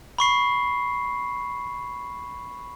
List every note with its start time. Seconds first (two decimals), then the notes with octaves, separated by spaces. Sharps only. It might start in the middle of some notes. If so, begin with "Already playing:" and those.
0.18 B5 C#6 C7